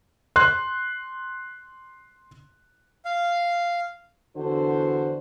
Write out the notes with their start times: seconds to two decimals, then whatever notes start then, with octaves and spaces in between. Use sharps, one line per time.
0.36 C6 F#6
3.05 F5
4.37 E2 D3 D4 F#4 A4 C5